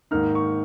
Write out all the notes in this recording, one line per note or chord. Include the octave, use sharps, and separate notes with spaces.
G#2 D#3 A#3 D#4 F6
C#6